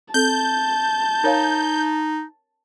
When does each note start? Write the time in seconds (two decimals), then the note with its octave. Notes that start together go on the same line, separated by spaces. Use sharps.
0.14 C4 A4 A5 G6
1.24 D#4 A#4 C#5 F5